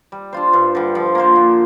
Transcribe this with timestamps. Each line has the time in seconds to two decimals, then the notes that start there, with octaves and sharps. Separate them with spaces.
0.12 G3
0.33 D4 F4 C5
0.53 G2
0.75 D3 G3
0.95 F3
1.15 A#3 F4 C5
1.36 A#2